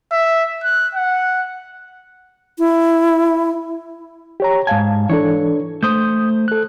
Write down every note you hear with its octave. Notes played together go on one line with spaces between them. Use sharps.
E5
F#6
F#5
E4
G4 C#5 A#5
G#2 F5 G#5 A5
E3 D4 A4 C#5
A3 C5 D#6 G6
A4 F#6